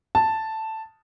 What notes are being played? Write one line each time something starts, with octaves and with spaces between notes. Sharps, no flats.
A5